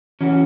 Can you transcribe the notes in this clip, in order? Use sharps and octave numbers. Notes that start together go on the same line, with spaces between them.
E3 C#4 F#4